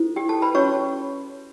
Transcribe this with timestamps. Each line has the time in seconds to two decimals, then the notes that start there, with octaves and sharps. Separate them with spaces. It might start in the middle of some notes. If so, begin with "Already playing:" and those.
Already playing: E4 A4 C5
0.16 G4 G5
0.29 A4 A5
0.42 B4 B5
0.54 C#4 F#4 B4 C#5 C#6